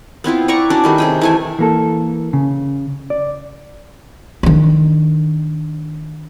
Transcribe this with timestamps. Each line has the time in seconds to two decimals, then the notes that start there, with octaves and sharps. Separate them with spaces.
0.24 B3 C4 E4 F4
0.48 B4 D5 A#5 C#6
0.70 C#4 D4 F#4 D5
0.84 D#3 G3 A3
0.98 C3 G#4 G5
1.22 E3 A3 G#5
1.59 E3 A#3 A4
2.33 C#3
3.10 D5
4.43 D#3 D4